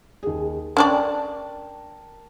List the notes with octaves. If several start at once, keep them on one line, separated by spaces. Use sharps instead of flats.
D#2 G#4
C#4 D4 A#4 D5 G5 A5